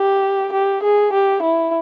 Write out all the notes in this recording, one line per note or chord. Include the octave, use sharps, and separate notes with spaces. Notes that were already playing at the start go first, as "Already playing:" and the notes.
Already playing: G4
G4
G#4
G4
E4